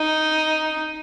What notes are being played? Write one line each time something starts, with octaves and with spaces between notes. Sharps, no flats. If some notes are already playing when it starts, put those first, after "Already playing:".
Already playing: D#4